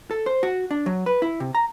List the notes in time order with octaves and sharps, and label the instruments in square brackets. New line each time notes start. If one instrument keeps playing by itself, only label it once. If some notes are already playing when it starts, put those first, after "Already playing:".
[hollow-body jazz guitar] A4
C5
F#4
D4
F#3
B4
E4
C3
A#5